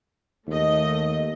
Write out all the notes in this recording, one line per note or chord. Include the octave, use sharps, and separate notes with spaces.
D#2 A3 D#5